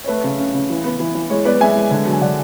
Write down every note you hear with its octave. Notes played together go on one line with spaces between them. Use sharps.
C#5
A3 B4
C#3
C#4
C#3
E3
B3
E3
E3
G#3 C#5
B3 B4 D5
G#3 E5 G#5
G#3
D3
F#3
G#5
D3 D5 F#5